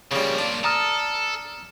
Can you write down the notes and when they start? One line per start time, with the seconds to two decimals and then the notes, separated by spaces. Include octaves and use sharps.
0.12 C#3 F3 G3 A#3
0.38 D4
0.64 A4 A#5 D#6 F6